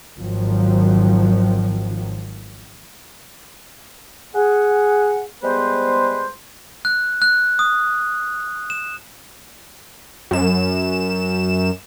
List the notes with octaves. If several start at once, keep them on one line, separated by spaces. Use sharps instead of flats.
G#1 D#3 F3 F#3
G#4 F#5
G3 G#3 B3 G#4 B4 C5
F#6
F#6
D#6
E7
F#2 E7